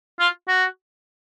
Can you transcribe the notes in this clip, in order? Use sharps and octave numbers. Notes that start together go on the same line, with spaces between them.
F4
F#4